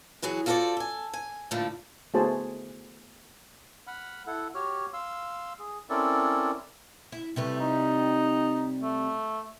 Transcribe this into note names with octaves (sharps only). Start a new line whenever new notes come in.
E3 F#3 F#4 G#4
F4 F#4 A4 B4 C5 D5
A4 G#5
G#5
A2 D3 F3 A3 A#3
A3 B3 F#4 G#4 C5 A5
F#5 B5 F6
E4 A4 F#5
F#4 G4 C#5 F6
F5 C6 E6
G#4
C4 C#4 E4 A4 A#4 D5
E4
C3 G3 A3 B4
D#4
A3